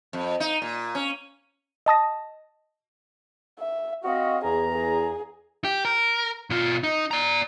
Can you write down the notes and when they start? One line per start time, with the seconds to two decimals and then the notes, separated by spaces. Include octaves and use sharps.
0.13 F2
0.40 D#4
0.62 A#2
0.95 C#4
1.86 D#5 A5 D#6 A#6
3.59 E5
4.05 C4 F#4 D#5 F5
4.44 E2 G#4 A#5
4.72 G#4
5.64 G4
5.85 A#4
6.50 B2 F4
6.83 D#4
7.11 D5 A#5